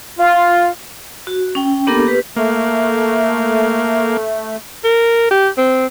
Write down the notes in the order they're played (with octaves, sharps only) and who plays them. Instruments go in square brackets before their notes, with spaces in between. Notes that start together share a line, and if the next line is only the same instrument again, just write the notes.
[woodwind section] F4
[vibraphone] F#4
C#4 G5
A#3 B3 D4 G4 A4 A#4
G4 B4
[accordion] A3 [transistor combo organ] A#3
[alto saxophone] A#4
G4
C4